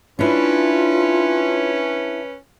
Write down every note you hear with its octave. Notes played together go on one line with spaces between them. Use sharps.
C#4 D4 E4 F4 B4